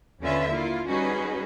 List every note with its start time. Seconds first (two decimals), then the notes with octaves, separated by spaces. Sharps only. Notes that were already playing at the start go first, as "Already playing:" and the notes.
0.22 D#2 D3 C#4 F4 B4 E5
0.51 A#3 E4 F4
0.86 G3 C#4 D#4 F#4 G#4 B4